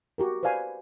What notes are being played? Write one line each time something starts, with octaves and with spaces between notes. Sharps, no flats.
F#4 G4 A#4
B4 C5 D5 F5 G#5 B5